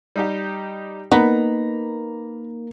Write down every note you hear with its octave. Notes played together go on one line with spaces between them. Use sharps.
G3 D#4 G4
A#3 B3 D#4 A#5 B5